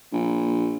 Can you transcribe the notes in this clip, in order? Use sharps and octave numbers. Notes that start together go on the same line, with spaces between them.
A#1